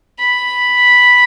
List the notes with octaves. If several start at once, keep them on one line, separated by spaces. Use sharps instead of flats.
B5